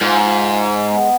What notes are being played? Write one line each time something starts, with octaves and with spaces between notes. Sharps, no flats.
G#2 F4
F4
G#3
G#3
B3